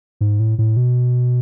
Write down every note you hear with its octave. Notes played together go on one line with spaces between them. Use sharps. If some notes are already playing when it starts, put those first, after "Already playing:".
G#2
A2
A2
B2